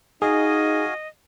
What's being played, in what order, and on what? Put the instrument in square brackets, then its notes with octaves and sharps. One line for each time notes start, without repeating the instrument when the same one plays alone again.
[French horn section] D#4 [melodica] F#4 F5 G#5 [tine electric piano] G#4 [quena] D#5